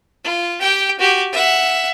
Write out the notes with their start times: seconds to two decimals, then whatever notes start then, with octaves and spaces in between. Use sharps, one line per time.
0.24 F4
0.60 G4 G5
0.99 F#4 G4
1.32 E5 F#5